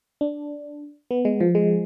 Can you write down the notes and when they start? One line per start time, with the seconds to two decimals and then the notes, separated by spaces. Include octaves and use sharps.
0.21 D4
1.11 B3
1.25 G#3
1.40 F3
1.55 G#3